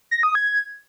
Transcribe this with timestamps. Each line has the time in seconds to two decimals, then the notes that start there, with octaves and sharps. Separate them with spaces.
0.11 A#6
0.23 D#6
0.35 G#6